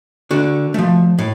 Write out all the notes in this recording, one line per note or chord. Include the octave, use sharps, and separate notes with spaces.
D3 F#4
F3 A3
A2